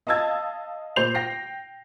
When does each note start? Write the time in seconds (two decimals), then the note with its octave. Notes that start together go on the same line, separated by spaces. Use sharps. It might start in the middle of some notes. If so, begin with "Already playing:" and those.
0.07 D#5 F5 A5 E6 G#6 A6
0.96 A#2 C5 G6 C7 F7
1.14 G5 A#6 C7